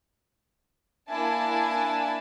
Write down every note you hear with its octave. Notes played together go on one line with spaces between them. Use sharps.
A#3 D4 E4 G#5 A5